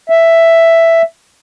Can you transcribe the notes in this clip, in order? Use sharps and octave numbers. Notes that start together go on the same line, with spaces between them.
E5